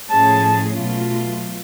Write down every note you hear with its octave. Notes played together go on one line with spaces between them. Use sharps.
A2 F3 A3 C#4 G#4 A5
B2 F#3 A3 F4